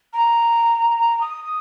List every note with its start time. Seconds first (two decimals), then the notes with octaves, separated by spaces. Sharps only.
0.13 A#5
1.21 D#6